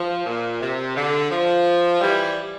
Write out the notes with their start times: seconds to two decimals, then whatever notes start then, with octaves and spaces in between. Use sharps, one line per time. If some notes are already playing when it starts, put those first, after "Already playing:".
Already playing: F3
0.26 A#2
0.61 C3
0.96 D3
1.31 F3
2.01 E3 G3